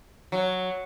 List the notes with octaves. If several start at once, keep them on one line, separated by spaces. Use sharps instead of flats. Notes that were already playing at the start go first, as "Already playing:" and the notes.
F#3